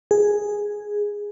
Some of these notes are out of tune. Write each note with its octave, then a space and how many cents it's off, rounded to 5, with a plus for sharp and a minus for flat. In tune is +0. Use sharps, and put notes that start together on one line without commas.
G#4 +0